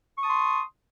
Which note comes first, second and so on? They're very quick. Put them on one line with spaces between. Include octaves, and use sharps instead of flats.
C#6 D#6 A5 C6